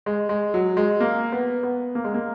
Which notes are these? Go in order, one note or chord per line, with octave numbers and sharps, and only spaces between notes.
G#3
G#3
F#3
G#3
A#3
B3
B3
A#3
G#3
A#3